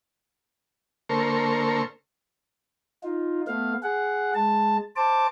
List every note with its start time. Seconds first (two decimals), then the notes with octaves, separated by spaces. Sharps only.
1.09 D3 A#3 A4 A#4 C5 C#6
3.03 D#4 F4
3.47 A3 B3 F5
3.83 G#4 F#5
4.35 G#3 A5
4.96 C5 A5 D6